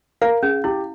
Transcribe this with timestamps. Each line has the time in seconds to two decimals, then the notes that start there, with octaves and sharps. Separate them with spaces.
0.21 A#4 F5
0.43 C#4 G#4
0.64 E4 G4